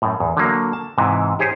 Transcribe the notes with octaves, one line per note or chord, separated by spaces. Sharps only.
F#2 A2
E2
D3 F#3 A#3
A5
G#2 C3 E3
D#4 G4 G#4 C5 C#5 D#5